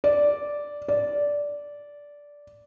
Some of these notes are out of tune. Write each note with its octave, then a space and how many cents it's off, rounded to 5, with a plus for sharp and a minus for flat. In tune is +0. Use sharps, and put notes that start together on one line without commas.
D5 -5
D5 -10